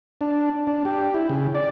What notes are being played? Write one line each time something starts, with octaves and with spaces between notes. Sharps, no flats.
D4
D4
G4
E4
C#3
D5